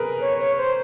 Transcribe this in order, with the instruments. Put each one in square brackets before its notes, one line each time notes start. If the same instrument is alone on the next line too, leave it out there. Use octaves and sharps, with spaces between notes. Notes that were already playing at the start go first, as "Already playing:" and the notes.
Already playing: [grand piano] G#4 A#4 B4
[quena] C#5
C#5
C5